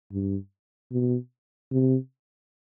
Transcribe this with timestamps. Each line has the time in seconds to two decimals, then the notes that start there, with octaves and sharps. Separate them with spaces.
0.12 G2
0.92 B2
1.72 C3